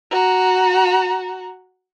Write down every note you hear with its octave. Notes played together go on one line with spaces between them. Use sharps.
F#4 A#5